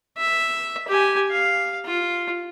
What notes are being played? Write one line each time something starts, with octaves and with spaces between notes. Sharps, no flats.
E5
G4 G#5
F5
F4